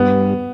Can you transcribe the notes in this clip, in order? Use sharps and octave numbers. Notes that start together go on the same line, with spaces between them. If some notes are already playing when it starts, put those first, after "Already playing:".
Already playing: G2 B3